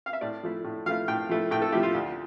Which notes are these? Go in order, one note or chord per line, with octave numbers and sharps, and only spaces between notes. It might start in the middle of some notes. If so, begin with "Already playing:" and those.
F5
E5
A2 D5
F3 A3 E4
A2
F3 A3 E4 F5
A2 G5
F3 A3 E4
A2 G5
A4
F3 A3 E4 G4
F4
D2